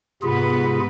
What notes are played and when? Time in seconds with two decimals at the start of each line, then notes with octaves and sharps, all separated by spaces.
0.23 G#2 C3 B3 F4 G#4 B4